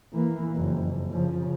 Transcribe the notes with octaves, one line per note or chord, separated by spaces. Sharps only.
E3 A#3
F#1 F2
C#3 F3